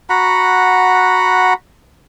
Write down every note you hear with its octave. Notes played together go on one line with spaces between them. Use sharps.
F#4 F#5 A#5 B5